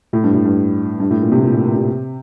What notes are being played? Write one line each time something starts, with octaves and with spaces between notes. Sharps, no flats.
A2
G2
A2
G2
G2
A2
A#2
C3
A#2
A2
A#2
C3